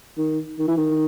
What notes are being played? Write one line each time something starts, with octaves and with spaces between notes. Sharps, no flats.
D#3
D#3
E3
D#3